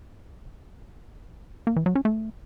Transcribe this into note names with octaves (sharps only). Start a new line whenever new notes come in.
A#3
E3
F#3
C#4
A3